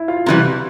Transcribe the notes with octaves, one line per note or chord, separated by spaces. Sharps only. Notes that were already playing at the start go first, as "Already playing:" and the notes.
Already playing: E4
F4
C3 E3 G3 F#4